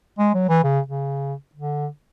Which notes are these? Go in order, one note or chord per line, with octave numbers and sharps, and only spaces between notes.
G#3
F#3
E3
C#3
C#3
D3